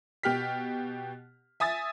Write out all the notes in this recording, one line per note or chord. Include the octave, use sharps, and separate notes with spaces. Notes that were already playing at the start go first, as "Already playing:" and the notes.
B2 G4 F6 B6
E5 G#5 D#6 A6